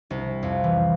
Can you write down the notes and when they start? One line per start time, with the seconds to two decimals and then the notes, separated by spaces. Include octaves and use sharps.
0.10 C2
0.43 F2
0.64 E3